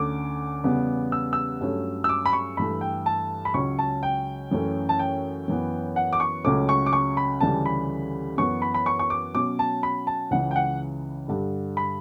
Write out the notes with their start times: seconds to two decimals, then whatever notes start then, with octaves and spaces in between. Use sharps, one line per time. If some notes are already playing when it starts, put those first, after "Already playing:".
Already playing: D2 D3 A3 C#4 D6
0.64 E2 C#3 G3 B3
1.12 E6
1.33 E6
1.61 G2 F#3 A3 C#4
2.04 E6
2.09 D6
2.26 B5
2.33 C#6
2.57 G2 E3 A3 B5
2.81 G5
3.06 A5
3.45 B5
3.54 C#2 C#3 F#3 C#4 C#6
3.79 A5
4.03 G5
4.51 F#2 E3 A3 C#4
4.89 A5
4.99 G5
5.48 F#2 E3 B3
5.96 F#5
6.13 D6
6.20 C#6
6.45 C#2 C#3 F#3 A3 C#4 D6
6.69 C#6
6.86 D6
6.93 C#6
7.17 B5
7.41 D2 C#3 E3 G3 A5
7.66 B5
8.37 F#2 E3 B3 C#6
8.62 B5
8.74 B5
8.86 C#6
8.99 C#6
9.10 D6
9.34 B2 F#3 C#4 D6
9.59 A5
9.83 B5
10.07 A5
10.31 C#2 C#3 E3 F#5
10.51 G5
10.56 F#5
11.28 G2 D3 G3
11.77 B5